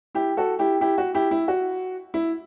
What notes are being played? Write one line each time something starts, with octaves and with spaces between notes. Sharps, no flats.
E4 G4
F#4 A4
E4 G4
E4 G4
F#4
E4 G4
E4
F#4
E4